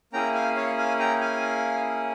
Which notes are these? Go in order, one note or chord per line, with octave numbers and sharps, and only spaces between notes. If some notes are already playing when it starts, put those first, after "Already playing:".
A#3 C#4 E4 G#4 G5 A#5
F5 G#5
C#5 F5
F5 G#5
G5 A#5
F5 G#5